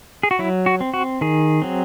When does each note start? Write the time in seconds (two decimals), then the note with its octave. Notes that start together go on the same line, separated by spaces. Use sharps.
0.23 G#4
0.31 F#4
0.39 F#3 E4
0.66 F#4
0.81 C4
0.94 F#4
1.21 D#3 G#4
1.62 F#3 C4